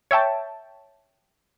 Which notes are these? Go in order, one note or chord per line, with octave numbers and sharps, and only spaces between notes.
C#5 E5 G5 A5